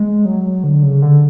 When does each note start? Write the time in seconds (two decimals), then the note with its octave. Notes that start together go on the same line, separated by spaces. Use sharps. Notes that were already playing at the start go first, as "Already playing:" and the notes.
Already playing: G#3
0.25 F#3
0.64 D3
0.83 C#3
1.02 D3